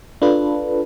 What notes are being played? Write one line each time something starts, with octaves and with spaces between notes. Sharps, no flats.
D4 F4 A4 B4